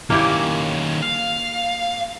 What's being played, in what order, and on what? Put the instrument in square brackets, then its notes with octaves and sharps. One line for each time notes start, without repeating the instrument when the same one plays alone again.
[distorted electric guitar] D#3 C#4 [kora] A#3 E4 G4
[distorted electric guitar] F5